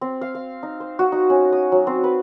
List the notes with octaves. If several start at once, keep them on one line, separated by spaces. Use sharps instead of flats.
C4
F5
F5
D#4
C5
F#4
D#4
C#4
D#6
F#3
C4
B4